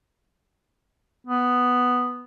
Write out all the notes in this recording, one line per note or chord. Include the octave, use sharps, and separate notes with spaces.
B3